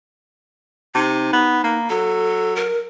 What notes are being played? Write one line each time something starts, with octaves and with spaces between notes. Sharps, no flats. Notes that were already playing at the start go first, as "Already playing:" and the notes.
C3 D#4
B3
A#3
F#3 A4
A#4